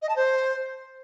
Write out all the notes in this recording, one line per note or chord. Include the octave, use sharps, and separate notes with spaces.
D#5
A5
C5